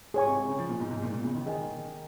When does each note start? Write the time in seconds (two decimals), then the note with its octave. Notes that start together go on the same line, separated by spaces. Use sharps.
0.14 G#2 G#4 C#5 G#5 C#6
0.26 C3
0.37 C3
0.47 C#3
0.59 F3
0.69 A#2
0.80 G#2
0.91 G#2
1.02 A#2
1.13 A#2
1.24 C#3
1.35 D#3
1.46 D#3 G#4 D#5 G#5